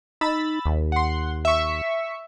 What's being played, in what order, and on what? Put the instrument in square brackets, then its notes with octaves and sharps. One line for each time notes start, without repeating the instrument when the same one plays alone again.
[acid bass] D#4 [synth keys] B5 E6 A6
[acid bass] D#2
[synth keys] F#5 C6
E5 C#6